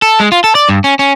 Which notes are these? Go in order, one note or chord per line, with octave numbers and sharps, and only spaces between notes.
A4
G#3
F4
A4
D5
G2
C#4
C#4